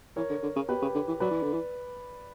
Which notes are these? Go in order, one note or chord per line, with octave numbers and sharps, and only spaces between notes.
E3 A#4 C#5
D3
D3
C#3
B2 G4 B4
C#3
D3
E3
F#3 B4 D5
E3
D3
E3